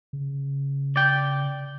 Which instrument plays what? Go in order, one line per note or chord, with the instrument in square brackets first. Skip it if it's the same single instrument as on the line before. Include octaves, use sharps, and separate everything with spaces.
[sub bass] C#3
[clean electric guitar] D5 G5